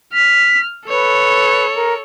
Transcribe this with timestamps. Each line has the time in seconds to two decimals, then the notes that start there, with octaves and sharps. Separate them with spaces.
0.13 F6 B6
0.89 A4 B4 C#5
1.75 A#4